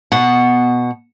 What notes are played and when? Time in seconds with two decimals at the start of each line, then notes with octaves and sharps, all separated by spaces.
0.12 B2 F#5